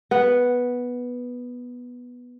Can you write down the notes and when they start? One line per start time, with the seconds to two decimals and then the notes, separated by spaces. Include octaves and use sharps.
0.11 B3 B4